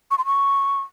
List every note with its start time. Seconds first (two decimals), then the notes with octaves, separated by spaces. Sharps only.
0.11 C#6
0.18 C6
0.26 C#6